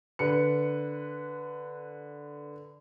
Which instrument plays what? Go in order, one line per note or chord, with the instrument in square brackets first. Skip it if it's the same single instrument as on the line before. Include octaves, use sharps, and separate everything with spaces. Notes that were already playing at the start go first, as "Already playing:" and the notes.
[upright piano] D3 B4 C#7